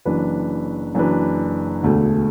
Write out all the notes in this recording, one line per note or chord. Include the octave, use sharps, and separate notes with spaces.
F#1 F#2 E3 D4 B4
F#1 F#2 E3 D4 B4
E1 D2 D3 A3